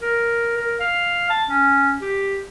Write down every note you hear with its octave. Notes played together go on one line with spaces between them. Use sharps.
A#4
A#4
F5
A5
C#4
G4